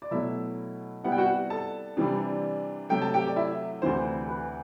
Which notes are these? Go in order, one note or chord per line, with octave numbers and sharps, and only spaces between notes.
D5
B2 F#3 A3 E4 E5
C3 G3 B3 E4 F#5
G5
F#4 F#5
A4 A5
C3 E3 G3 D4
C3 F#3 A3 G5
A5
G4 G5
D5
E4 E5
D2 C3 E3 C5
B4